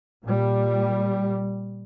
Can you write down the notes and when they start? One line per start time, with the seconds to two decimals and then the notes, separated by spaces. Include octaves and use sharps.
0.24 A#2 G3